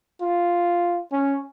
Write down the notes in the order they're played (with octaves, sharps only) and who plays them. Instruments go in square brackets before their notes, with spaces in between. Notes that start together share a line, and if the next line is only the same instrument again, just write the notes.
[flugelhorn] F4
C#4